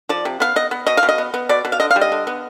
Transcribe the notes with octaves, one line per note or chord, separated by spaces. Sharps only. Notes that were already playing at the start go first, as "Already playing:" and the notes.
F3 D5
C3
B3 F5
B3 D#5
B3
B2 D#5
F5
B2
D#5
B3
B3
B2 D5
B2
F5
D3 D#5
F5
G3
D#5
D3
B3